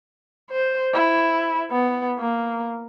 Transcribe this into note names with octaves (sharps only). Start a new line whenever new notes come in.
C5
E4
B3
A#3